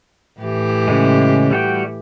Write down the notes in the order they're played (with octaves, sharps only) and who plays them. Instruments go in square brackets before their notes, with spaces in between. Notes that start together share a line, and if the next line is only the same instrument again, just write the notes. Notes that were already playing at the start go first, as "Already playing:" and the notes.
[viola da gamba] A2 E3 G4
[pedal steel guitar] C#3 G#3
G3 F#4 G5